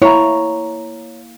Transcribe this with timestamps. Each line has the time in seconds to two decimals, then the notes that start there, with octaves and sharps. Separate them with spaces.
0.02 A#3 E4 C#5 A#5